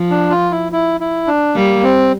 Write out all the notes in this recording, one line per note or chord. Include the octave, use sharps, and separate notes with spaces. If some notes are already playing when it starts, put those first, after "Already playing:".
Already playing: F3
D4
F4
E4
E4
E4
D4
G3 A#3
C4